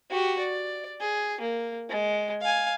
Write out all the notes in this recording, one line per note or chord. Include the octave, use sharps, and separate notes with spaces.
F#4 G4
D5
G#4
A#3
G#3
F5 G#5